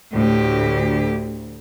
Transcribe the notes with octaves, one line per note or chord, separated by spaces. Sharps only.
D2 A2 G4